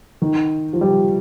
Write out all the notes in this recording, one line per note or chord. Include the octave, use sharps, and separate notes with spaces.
D#3
F3
G3